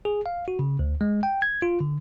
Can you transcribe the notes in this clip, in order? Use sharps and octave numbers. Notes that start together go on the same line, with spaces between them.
G#4
F5
F#4
C#3
D2
G#3
G5
G#6
F4
D3